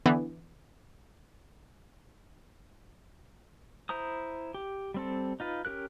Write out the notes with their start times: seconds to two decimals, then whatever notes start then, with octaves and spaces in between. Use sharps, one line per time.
0.06 D3 E3 B3
3.89 E4 C5 A#5 D#6
4.54 G4
4.94 G3 C4 A4
5.40 D#4 F4 B4
5.65 C#4 G4 A#4 F#6